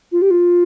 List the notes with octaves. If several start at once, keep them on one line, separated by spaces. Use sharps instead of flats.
F4
G4
F4